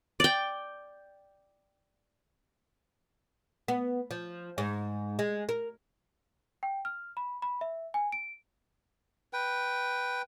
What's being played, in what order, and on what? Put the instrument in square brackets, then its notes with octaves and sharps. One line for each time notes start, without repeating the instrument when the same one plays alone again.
[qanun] D5 G5
[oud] B3
F3
G#2
G#3
A#4
[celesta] G5
F6
B5
B5
E5
G#5
D7
[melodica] B4 G5